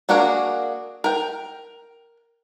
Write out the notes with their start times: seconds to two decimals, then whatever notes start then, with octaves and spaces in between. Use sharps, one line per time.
0.09 A#3 D4 F#4 G#4 A#4
1.04 A#4 G5